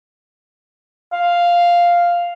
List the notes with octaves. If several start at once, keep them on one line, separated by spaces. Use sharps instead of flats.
F5